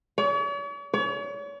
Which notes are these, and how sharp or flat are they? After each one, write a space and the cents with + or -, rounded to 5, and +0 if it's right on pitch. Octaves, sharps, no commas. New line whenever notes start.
C#5 +45
C#5 +40